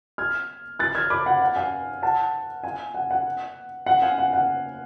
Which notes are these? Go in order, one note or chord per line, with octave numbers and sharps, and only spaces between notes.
F6 G#6
F#6 A6
F6 G#6
B5 D6
F#5
F#5
F5 G#5
F#5 A5
F5 G#5
F#5
F#5
F#5
F5 G#5
F#5
F#5